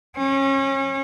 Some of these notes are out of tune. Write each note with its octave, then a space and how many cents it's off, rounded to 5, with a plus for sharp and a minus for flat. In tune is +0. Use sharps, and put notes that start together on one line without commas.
C#4 -30